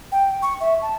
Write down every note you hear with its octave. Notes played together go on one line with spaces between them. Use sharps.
G5
C#6
E5
A5